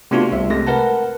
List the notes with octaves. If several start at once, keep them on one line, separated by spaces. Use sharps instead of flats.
C3 A3 B3 D4 F4 F#4
C2 E5
C3 G#3 A3 A#6
A#4 B4 F#5 A5